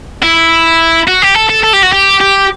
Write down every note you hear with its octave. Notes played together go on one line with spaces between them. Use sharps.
E4
F#4
G4
A4
A4
A4
G4
F#4
G4
G4